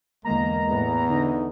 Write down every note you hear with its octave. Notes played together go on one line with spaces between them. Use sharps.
E2 D3 G#3 A#3 A#5
E2 A2 B3
D3 D#4